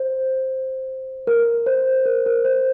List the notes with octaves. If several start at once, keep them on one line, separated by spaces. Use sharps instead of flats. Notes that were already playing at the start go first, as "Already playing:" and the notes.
Already playing: C5
A#4
C5
A#4
A#4
C5